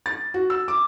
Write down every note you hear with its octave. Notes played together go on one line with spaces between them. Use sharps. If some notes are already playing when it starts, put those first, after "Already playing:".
A6
F#4
E6
D6